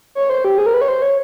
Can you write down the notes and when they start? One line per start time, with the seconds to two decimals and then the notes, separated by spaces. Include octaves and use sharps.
0.15 C#5
0.29 C5
0.45 G4
0.58 G#4
0.66 A#4
0.74 B4
0.81 C#5
0.88 C5
1.02 C#5